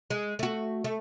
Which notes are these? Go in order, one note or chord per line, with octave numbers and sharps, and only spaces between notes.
G#3
A3 F#4
A3